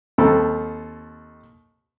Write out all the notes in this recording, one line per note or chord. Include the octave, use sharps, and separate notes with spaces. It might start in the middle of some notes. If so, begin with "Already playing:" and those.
D#2 C4 A4 B5